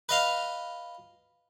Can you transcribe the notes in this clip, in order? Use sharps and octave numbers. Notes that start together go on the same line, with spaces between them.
B4 D#5 F5